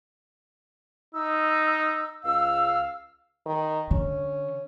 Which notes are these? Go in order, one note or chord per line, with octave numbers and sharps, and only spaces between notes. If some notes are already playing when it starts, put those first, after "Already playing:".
D#4 E6
C#2 F5 E6
D#3
D3 C#4